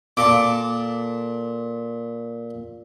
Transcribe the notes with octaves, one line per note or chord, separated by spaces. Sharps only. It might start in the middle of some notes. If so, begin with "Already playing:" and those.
A#2 A4 D6